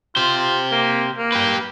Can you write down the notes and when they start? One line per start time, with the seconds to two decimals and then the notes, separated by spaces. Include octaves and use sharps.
0.17 F4 G4 C5
0.72 A#3
1.18 A#3
1.32 G4 B4